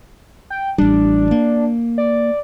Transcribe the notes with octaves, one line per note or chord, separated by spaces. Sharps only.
G5
A1 G3 D4
A#3
D5